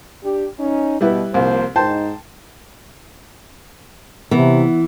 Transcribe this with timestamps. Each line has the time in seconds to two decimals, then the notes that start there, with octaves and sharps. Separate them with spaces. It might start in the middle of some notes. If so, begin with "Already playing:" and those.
0.24 D4 G4
0.60 C#4 D#4
1.01 B2 G3 E4 B4
1.34 C2 F3 A#3 C5
1.76 G#2 D#4 C5 G5 A5
4.31 C3 E3 B3